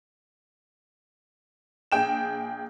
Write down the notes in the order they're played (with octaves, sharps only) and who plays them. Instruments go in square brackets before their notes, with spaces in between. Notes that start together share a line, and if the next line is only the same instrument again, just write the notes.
[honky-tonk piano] A#1 G#4 G5 E7